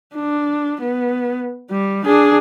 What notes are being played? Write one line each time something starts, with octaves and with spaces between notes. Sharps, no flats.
D4
B3
G3
D4 G#4